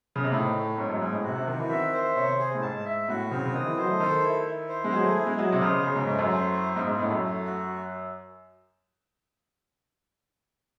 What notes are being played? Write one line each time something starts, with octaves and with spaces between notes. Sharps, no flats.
C#3
C3
A2 D#4
A3
G#2 C#5
F#2
G#2 G#4
A2
C3 F#4
C3
D#3 C4
E3
D#3 E5
C5
C3 C#5
G#4
A2
G#2 A5
E5
A2 F#4
C#3 C4
C#3
D#3 D#5
E3
F#3 C5
A3
D#3 A4
E4
E4
C5
G#3
F#3 G#4
A3
E4
G#3
F#3 D#5
C3
C#3 C5
C#3 C#4
G#2
G#2 A3
F#2
C5
E4
G#2 D#4
G#2
A2 A3
F#2
A3
F#4